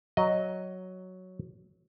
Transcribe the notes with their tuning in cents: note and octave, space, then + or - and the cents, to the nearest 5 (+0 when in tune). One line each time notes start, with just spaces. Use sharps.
F#3 +0 D#5 +0